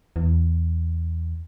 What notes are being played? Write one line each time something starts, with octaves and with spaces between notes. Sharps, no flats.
E2